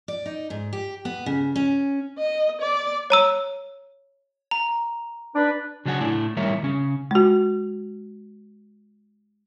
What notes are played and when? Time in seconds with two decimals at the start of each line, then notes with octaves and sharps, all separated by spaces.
0.08 D5
0.26 D#4
0.50 G#2
0.73 G4
1.05 B3
1.26 C#3
1.56 C#4
2.18 D#5
2.62 D5
3.10 C#5 A#5 E6
4.51 A#5
5.35 D4 B4
5.85 C#3 F#3 D4 F#5 G#5
6.00 A2 A3 D4 E4
6.37 A2 D#3 G3 A#4 C#5 E5
6.63 C#3 C#4
7.11 G#3 F#4